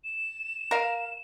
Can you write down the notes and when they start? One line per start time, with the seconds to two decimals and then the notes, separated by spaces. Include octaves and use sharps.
0.04 E7
0.71 A#4 F5